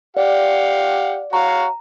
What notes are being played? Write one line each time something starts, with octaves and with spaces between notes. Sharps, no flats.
G4 D5 F5 F#5
F#4 C#5 F5 A#5